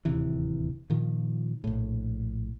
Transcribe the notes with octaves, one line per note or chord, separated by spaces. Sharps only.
D1 D#2 C3 E3
A#2 D#3 F3
A#1 A2